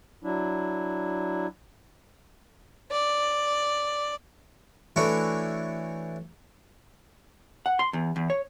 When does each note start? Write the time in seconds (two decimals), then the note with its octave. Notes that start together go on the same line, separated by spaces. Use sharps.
0.24 F#3 D4 E4
2.92 D5
4.96 E3 A3 D4 E4 F#4 C#5
7.66 F#5
7.79 C6
7.93 E2
8.16 E2
8.30 C#5